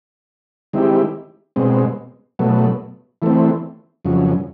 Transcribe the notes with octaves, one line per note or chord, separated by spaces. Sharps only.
D#3 G#3 C4 E4 G4
B2 G#3 C4
B2 F#3 A3
E3 A3 C4
F2 C#3 F#3